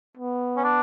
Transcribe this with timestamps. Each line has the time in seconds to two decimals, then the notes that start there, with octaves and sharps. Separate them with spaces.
0.17 B3
0.57 C#4
0.64 D4